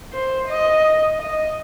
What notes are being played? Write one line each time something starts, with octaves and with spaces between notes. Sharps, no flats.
C5
D#5
D#5